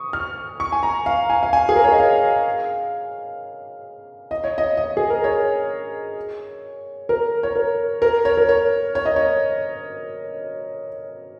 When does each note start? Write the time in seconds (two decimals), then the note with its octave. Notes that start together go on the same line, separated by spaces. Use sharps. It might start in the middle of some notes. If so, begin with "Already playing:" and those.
Already playing: C#6 D#6
0.13 F6
0.60 C#6
0.72 G#5
0.83 A#5
1.06 F5
1.30 G#5
1.43 F5
1.53 G#5
1.69 G#4
1.76 A#4
1.84 C#5
1.92 D#5
1.99 F5
4.31 D#5
4.44 C#5
4.58 D#5
4.77 D#5
4.97 G#4
5.10 A#4
5.24 C#5
7.09 A#4
7.43 C#5
7.56 A#4
8.02 A#4
8.25 C#5
8.37 A#4
8.49 C#5
8.95 C#5
9.05 D#5
9.16 C#5